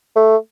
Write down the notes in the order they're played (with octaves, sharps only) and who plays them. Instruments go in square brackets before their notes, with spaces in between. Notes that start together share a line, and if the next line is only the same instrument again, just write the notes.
[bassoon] A3